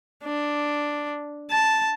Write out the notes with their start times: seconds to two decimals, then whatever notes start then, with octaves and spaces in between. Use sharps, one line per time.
0.24 D4
1.51 A5